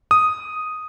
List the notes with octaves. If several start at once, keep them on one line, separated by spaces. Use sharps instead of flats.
D#6